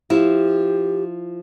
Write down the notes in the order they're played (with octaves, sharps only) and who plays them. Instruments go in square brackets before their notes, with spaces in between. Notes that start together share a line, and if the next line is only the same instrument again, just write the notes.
[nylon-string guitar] F3 E4 [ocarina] G4